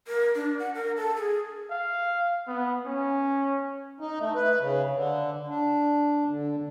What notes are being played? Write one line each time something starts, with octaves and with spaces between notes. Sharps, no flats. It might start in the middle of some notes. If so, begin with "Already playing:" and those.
A#4
D4
F#5
A#4
A4
G#4
F5
B3
C#4
D#4
A3
B4
C#3
D3
D4
D3